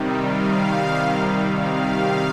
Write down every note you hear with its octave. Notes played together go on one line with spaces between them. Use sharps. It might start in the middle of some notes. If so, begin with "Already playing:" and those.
Already playing: C3 D#3 G3
F5
F5